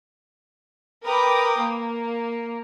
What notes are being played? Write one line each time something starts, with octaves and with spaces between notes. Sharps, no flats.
A#4 B4 G5 D6 D#6
A#3